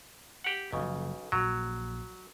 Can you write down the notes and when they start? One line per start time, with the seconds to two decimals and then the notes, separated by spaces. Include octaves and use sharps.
0.44 G4 F#5
0.72 F#1 B1 A#2 C#3 F3
1.32 A#1 A#2 F#3